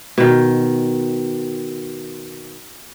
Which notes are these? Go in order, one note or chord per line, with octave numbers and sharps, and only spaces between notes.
B2 D#3